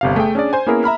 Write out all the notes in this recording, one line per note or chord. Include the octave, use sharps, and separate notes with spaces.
G1 C3 F5
A3 G#4 G5
C#4 D4 G#4 D5
C5 G#5
A#3 B3 C#4 E4 G#4 A#4
E5 A#5 B5 F6